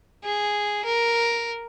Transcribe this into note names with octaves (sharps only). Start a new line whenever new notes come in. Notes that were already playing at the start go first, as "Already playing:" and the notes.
G#4
A#4